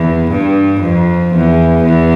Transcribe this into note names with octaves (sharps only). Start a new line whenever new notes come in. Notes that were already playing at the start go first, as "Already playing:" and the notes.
Already playing: E2
G2
F2
E2
E2